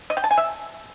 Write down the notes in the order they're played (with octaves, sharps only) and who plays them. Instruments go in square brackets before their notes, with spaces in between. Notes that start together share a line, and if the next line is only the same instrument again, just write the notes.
[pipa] D#5
G5
A5
G#5
E5